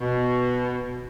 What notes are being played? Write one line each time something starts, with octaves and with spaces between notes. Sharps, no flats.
B2